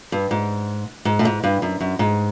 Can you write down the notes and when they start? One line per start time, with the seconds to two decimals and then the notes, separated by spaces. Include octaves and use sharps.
0.12 G2
0.31 G#2
1.05 G#2
1.19 A2
1.25 G#2
1.44 G2
1.62 F#2
1.80 F#2
1.99 G#2